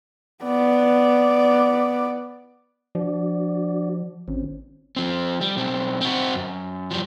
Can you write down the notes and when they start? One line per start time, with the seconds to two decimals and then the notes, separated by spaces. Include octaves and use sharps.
0.44 B3 D5
2.95 F3 D4 F#4 D5
4.28 G#1 C4 C#4
4.96 F3 C4
5.41 G3
5.57 B1 C4
6.01 C4 F#4
6.35 F#2
6.91 F3 G3